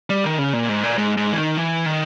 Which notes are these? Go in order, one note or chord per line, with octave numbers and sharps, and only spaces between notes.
G3
D#3
C#3
A#2
G#2
A#2
G#2
G#2
E3
D#3
E3
D#3